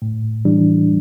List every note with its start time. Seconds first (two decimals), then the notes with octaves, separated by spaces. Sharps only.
0.02 A2
0.45 E3 G3 D4